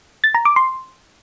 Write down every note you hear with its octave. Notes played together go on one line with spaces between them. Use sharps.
A6
A#5
D6
C6